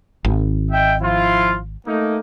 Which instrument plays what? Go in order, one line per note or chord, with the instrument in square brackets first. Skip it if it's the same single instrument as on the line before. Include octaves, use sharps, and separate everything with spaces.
[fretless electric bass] G#1
[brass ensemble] D#5 E5 G5
F3 E4 F4
A3 A#3 D#4